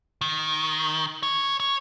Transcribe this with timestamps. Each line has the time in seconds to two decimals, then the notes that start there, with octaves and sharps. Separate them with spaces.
0.21 D#3
1.23 C#5
1.60 C#5